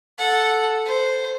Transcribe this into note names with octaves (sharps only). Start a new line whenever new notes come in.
A4 F#5
C5